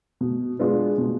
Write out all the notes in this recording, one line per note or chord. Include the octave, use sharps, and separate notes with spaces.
B2
G#3 B3 D4 F4
B2